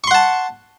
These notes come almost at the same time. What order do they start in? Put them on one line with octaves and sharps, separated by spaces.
C#6 C6 F#5 A5